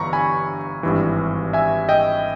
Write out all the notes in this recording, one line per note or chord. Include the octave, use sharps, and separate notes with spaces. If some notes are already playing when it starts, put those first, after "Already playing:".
Already playing: G1 G2 E3 A#5 B5 C#6
G#5 B5
G#1 G2 E3
E5 G#5
D#5 G5